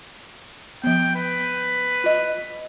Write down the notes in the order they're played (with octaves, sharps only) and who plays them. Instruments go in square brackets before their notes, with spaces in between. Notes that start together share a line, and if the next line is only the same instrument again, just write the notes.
[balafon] F3 B3 [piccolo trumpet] G5
[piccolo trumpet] B4
[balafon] F4 D#5